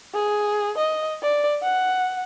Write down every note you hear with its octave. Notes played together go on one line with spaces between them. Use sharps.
G#4
D#5
D5
F#5